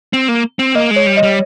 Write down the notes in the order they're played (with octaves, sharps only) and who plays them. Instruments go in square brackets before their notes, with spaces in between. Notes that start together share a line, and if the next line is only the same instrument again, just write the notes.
[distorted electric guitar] C4
A#3
C4
[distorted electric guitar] A#3 [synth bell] D#5
[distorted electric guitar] G#3
[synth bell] C#5
[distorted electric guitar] G3
[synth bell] D#5
[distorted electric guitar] G3